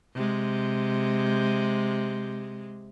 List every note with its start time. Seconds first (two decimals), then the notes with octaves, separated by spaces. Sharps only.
0.15 C3 G#3